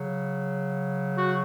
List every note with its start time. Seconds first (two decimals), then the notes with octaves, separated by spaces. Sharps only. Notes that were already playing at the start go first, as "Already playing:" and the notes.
Already playing: C#3 F#3
1.16 F#4